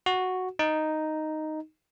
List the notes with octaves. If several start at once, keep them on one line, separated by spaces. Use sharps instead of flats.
F#4
D#4